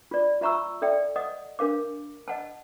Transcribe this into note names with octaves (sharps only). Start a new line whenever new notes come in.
F4 D5
F4 E5 A#5 C#6 E6
A4 D5 E5 G5
D#5 F#5 D#6
D4 A#4 F5 D6
D#5 F#5 A5